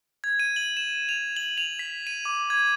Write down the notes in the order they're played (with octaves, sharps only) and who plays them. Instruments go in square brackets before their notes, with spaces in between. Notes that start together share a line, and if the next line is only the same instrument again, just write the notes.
[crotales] G#6
D#7
F#7
E7
F7
F#7
F7
B6
D#7
D6
G#6